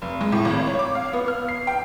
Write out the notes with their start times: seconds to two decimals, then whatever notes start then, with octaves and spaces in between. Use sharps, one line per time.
0.02 F1
0.21 G#3
0.32 A2
0.45 G#1
0.66 C#5
0.79 D6
0.95 F5
1.13 B3
1.28 F6
1.48 C7
1.67 G5